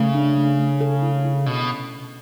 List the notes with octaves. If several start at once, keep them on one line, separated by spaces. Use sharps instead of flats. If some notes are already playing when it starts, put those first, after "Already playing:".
Already playing: C#3 A3
D4
A3
A3
A4
E4
E4
B2 C#4